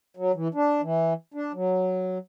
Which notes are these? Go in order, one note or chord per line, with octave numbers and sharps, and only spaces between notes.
F#3
E3
D4
E3
D4
F#3